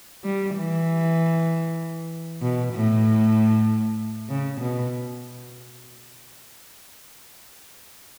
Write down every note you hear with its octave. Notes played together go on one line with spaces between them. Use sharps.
G3
E3
B2
A2
C#3
B2